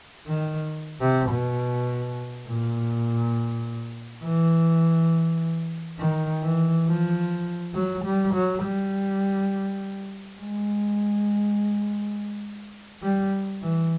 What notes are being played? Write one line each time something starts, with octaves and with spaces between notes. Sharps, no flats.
D#3
C3
B2
A#2
E3
D#3
E3
F3
F#3
G3
F#3
G3
G#3
G3
E3